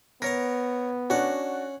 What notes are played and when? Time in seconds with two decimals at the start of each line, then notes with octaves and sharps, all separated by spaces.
0.22 B3 A#4 C#5 A#5 A#6
1.10 C#4 D4 F#4 F#5